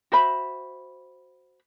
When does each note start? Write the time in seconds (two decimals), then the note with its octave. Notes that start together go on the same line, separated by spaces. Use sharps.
0.12 F#4 C5 E5 B5